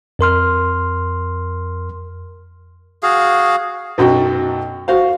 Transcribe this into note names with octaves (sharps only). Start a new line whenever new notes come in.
F2 A#4 C6 F6
F#4 G#4 F5
B1 F#2 F#4 G5
F#4 C5 F5